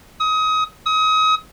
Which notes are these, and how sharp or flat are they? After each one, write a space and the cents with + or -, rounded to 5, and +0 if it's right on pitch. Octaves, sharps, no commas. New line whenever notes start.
D#6 +25
D#6 +30